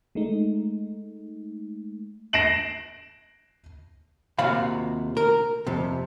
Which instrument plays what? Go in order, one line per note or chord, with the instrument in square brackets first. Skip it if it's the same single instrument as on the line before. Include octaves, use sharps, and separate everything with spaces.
[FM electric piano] G#3 A3 D#4
[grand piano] A#6 C7 D7 E7 F#7
[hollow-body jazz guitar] D#2 C3 F4 F#4 F5 B5
A#4
F2 C3